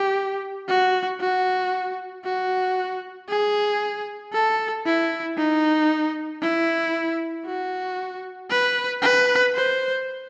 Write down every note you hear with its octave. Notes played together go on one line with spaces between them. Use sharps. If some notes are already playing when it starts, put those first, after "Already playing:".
Already playing: G4
F#4
F#4
F#4
G#4
A4
E4
D#4
E4
F#4
B4
B4
C5